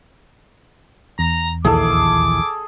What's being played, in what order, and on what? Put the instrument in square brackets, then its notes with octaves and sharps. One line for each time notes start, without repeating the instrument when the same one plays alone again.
[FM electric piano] E2 [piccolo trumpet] A#5
[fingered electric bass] A#1 D#2 E3 [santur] G#4 A4 [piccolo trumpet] D6